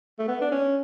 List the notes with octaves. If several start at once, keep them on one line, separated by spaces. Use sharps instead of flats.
A3
B3
D4
C#4